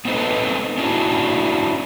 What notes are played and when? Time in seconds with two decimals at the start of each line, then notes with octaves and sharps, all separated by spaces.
0.05 B3 C4 D#4 G#4 A4 B4
0.78 C#4 D4 E4 F#4